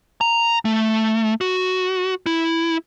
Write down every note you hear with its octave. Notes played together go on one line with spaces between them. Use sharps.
A#5
A3
F#4
E4